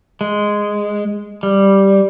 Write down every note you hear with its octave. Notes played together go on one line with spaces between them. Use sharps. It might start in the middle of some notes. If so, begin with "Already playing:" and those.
G#3
G3